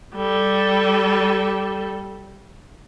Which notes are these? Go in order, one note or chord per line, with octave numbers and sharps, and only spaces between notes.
G3 A4